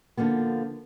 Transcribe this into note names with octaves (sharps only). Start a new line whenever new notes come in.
D3 F3 A#3 B3